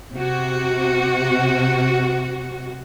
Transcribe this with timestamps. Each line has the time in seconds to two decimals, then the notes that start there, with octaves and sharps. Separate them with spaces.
0.14 C3 F#4